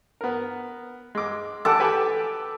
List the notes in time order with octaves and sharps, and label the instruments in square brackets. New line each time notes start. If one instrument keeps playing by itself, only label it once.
[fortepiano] B3 A#4
G#3 D6
[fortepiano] G4 F#5 A5 [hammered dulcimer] A4 D6
[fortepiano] G4 B4 G#5